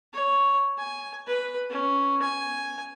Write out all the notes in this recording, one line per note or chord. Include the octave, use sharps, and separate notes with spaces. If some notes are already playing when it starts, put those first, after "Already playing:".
C#5
G#5
B4
C#4
G#5